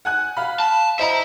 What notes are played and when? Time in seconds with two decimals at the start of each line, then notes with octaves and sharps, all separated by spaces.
0.05 F#5 G#5 F#6
0.37 F5 B5
0.60 A5
0.99 E4 C5 D#5 E5 A#5